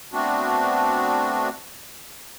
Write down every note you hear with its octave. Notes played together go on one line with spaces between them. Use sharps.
A3 B3 C4 D4 F#4